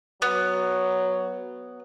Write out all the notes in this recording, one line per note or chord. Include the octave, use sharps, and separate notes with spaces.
F#3 B3